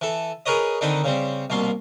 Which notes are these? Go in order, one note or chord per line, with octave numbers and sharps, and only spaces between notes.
E3 A4
G#4 A#4 B4 C#5 D#5
D3 D#3 C4 D#4 B4
C#3 G3 C4
C2 B2 A#3 C6